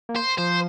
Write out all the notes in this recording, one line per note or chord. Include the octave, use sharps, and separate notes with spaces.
A#3
C5
F3 C5